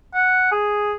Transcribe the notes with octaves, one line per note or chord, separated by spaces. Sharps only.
F#5
G#4